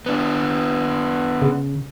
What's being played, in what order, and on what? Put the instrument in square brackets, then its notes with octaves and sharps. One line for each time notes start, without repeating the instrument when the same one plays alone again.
[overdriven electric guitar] B3 D4
[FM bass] C#3